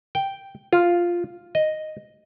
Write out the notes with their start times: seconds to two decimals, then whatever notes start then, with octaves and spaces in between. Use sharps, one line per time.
0.15 G5
0.73 F4
1.55 D#5